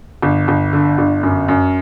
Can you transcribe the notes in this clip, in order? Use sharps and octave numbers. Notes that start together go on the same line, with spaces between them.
G1
G1
D3
G1
F#2
F#2